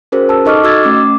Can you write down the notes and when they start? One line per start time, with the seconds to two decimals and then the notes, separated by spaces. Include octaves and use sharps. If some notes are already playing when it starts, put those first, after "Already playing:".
0.12 C#4 F#4 G#4 A#4 C5
0.29 A5 E6
0.45 D#4 A4 D#5 C#6 D6 F6
0.64 F#4 E6 G#6 A6
0.84 A3 C#4 D6